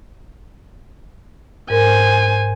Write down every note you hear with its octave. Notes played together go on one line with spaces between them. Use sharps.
G#2 A#4 C5 G#5